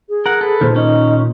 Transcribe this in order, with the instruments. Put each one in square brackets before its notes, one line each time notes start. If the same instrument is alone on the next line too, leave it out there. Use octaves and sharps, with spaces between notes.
[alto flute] G#4
[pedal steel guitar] A#4 F#5
A4 B4
[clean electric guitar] A#2 D#3 [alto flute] C5
[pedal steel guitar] C#4 [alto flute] D#4